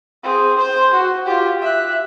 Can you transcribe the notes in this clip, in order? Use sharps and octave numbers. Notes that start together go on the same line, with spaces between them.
C4 G#4
C5 C6
F#4
F4 G4
E5 F#6